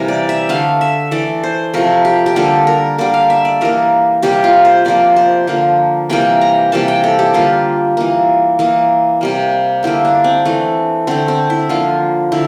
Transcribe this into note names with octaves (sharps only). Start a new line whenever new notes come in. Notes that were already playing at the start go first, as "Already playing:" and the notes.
Already playing: C3 E3 G3 A#3 A#4
D5
E5
D3 A3 F5
E5
E3 A3 D5
C5
C3 F3 A3 A#4
G4
G4
D3 G3 A#3 A4
A#4
D3 G3 A#3 D5
F5
E5
D5
E3 G3 A#3 A#4
C3 G3 A#3 G4
F4
C5
C3 F3 A#3 D5
C5
D3 F3 A#3
C3 E3 G3 A#3 G5
A#5
C3 E3 G3 A#3 A5
G5
A4
G4
D3 G3 A#3 F4
E3 A#3
E3 A#3
C3 G3 A#3
D3 G3 A#3 E4
D4
C4
E3 A3
D3 A3 C4
C4
E4
D3 F3 A#3 F4
D3 E4